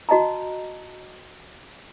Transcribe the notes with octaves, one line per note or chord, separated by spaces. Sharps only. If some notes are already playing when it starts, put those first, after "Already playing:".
F#4 D#5 A5 A#5